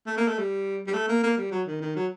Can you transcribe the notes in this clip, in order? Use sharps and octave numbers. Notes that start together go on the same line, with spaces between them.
A3
A#3
A3
G3
G3
A3
A#3
A#3
G3
F#3
D#3
D#3
F#3